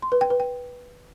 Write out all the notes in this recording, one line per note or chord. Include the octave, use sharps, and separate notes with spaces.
C6
B4
G5
B4
G5